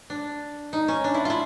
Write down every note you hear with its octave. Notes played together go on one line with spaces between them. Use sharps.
D4
D#4
C#4
D4
E4
F4
E4